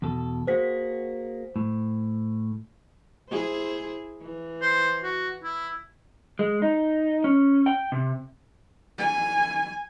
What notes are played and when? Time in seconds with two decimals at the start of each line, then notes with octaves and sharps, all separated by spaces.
0.02 E2 B2 A4
0.47 A#3 F#4 G#4 C5 B6
1.56 A2
3.29 E4 G#4 C5
4.22 E3
4.62 C5
5.03 F#4
5.43 E4
6.39 G#3
6.62 D#4
7.24 C#4
7.66 G5
7.92 C3
8.98 G#5